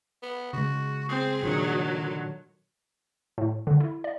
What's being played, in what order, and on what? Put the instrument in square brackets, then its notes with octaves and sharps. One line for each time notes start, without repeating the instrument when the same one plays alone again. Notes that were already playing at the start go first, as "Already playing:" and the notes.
[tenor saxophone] B3
[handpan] C#3 G#3 [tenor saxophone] F#4
[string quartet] C4 [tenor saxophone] G#4
[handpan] A#2 D4 [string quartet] D#3 F#3
[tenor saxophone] D3
[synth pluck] A2
D3
E4
D5